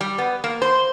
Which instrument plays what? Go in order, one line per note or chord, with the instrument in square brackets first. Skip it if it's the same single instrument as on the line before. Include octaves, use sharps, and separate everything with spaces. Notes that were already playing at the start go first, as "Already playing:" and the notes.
[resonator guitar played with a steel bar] G3
B3
A#3
C5